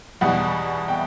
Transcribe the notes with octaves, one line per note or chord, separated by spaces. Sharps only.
E2 B2 G3 F#5
G5